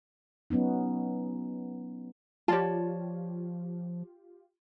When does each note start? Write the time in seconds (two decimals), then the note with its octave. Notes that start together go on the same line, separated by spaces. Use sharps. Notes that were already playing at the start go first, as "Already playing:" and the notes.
0.50 F#3 B3 C#4 D#4
2.48 F3 F4 G4 C#5 D5 A5